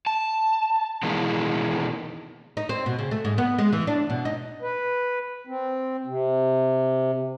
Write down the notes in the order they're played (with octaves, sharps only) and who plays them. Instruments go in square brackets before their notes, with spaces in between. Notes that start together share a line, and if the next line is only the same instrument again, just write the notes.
[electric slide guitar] A5
B2 D#3 E3 G#3 A#3
[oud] D#4
C4
B2
C#3
A3
G#2
B3
G#3
E3
D4
B2
D#4
[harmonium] B4
C4
C3